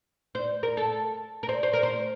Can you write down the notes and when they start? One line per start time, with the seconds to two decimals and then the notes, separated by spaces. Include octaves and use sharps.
0.35 C5
0.63 A#4
0.77 A4
1.43 A#4
1.49 C5
1.63 C5
1.73 A#4
1.83 C5